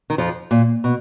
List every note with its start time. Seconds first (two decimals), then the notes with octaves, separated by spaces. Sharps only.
0.10 D#3
0.18 F2 F3
0.51 A#2
0.84 B2